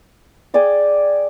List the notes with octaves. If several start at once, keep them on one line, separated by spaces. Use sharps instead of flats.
G#4 D5 G5 G#5